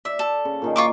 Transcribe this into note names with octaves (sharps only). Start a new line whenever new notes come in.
D5 E5
A4
C#3
A#2 D#3 G#4
F4 C#6 D6